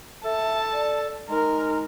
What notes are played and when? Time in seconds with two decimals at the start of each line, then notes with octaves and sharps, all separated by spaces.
0.25 A4 E5 A5
0.73 D5
1.29 G#3 D#4 A#4